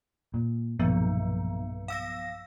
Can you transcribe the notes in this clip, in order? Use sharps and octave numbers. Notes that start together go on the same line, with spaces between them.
A#2
B1 G2 A#2 F3 B3
F5 E6 A#6